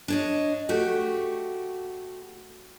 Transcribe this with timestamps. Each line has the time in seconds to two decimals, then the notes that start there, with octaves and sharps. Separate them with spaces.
0.08 D4 C#5 D#5
0.69 A3 F#4 G4